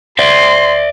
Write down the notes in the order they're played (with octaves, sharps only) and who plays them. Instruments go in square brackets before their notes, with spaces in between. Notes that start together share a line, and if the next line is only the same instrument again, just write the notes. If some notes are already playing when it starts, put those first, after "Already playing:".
[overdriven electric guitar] D5 E5 [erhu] C6